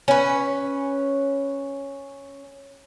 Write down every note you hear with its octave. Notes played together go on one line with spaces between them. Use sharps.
C#4 B4